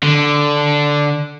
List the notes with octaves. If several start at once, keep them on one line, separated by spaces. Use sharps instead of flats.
D3